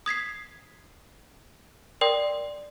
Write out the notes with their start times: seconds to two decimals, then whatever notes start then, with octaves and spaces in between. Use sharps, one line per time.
0.06 D#6 G#6 B6 C7
2.01 A#4 D5 G5 C6 D#6